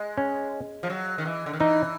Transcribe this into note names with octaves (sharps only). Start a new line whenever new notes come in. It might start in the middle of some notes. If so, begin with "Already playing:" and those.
Already playing: G#3
C#4
F3
F#3
D#3
E3
D3
D#3
E3 D#4